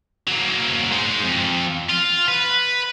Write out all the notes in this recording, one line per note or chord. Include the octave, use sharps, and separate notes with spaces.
F#3 A#3
G#3 D#4
F2
F4
B4